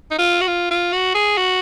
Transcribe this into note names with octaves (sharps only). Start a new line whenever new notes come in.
D#4
F4
F#4
F4
F4
F#4
G#4
F#4